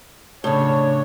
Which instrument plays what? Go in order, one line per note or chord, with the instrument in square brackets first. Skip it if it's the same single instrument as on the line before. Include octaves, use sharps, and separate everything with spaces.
[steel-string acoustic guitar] A2 C#3 [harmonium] D4 C#5